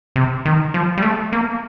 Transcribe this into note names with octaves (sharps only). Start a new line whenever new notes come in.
C3
D#3
F3
G3
A3
A#3